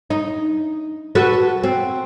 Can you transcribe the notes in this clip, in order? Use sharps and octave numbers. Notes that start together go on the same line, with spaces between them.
D#4
F#4 A4 B4
C4